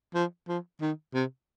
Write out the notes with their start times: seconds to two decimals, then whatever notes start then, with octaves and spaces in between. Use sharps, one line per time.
0.14 F3
0.48 F3
0.81 D#3
1.14 C3